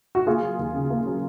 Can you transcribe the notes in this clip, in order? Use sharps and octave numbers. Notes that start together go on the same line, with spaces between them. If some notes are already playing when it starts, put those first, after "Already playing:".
F#4
A#3 F4 G#4
F#3
D#2
C#3
A#3
F#3